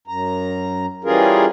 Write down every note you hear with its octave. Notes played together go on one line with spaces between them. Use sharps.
F#2 A#5
E3 G3 C#4 F4 G#4 A#4